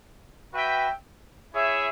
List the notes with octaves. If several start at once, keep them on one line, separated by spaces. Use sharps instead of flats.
F#4 B4 E5 G5
E4 G#4 C#5 E5